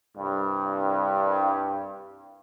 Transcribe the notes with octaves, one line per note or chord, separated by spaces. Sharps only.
C2 G2